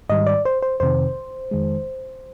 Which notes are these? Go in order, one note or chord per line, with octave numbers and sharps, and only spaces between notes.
G#2 D#3 G3 D#5
D5
C5
C5
F2 C3 D#3 C5
F2 D#3 G#3